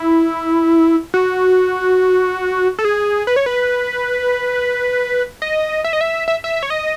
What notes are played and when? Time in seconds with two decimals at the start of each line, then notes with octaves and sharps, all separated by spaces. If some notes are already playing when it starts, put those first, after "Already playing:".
Already playing: E4
1.14 F#4
2.79 A4
2.85 G#4
3.27 B4
3.36 C#5
3.46 B4
5.42 D#5
5.84 E5
5.93 D#5
6.01 E5
6.28 E5
6.44 E5
6.63 C#5
6.70 D#5